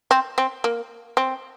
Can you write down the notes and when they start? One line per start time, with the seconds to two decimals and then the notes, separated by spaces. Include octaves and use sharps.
0.11 C4
0.38 C4
0.64 A#3
1.17 C4